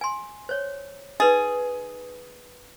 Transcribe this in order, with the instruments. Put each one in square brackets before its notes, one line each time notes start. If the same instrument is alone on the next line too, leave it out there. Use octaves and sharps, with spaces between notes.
[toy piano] G#5 C6
C5 C#5
[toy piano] D#4 B4 D#5 [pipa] G#4